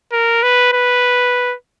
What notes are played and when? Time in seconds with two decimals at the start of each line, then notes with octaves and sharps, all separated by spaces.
0.12 A#4
0.43 B4
0.73 B4